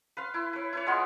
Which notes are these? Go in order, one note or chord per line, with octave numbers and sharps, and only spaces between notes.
B4 F5 C6
E4
B4 C#5
E4 B4 C#5
G#3 B3 F4 C6